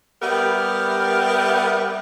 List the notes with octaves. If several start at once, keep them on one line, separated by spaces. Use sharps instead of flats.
G3 B3 G4 A#4 E5